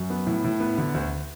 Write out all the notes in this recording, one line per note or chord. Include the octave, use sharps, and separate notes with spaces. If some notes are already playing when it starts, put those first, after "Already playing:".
Already playing: F#2
B3
A2
A2
B3
D3
D2